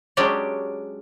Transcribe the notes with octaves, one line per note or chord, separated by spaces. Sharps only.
F#3 G#3 C#4 D4 G4 D5